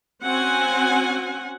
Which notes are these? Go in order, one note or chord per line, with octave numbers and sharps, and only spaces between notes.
C4 C#4 F#4 F#5 G#5